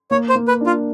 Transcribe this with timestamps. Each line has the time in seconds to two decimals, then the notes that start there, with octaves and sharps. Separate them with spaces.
0.11 A#3 C#5
0.29 C5
0.35 A#3
0.48 B4
0.61 D4
0.66 F4